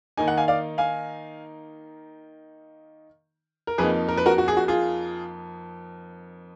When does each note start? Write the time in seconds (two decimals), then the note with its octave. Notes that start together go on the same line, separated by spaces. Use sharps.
0.17 D#3 A#3 D#4 G#5
0.28 F#5
0.37 F5 G#5
0.48 D5 F5
0.78 F5 G#5
3.67 A#4
3.78 F2 F3 A#3 D#4 G#4 B4
4.08 A#4
4.17 B4
4.26 F#4 A#4
4.38 F#4
4.48 G#4
4.57 F#4
4.68 F4 G#4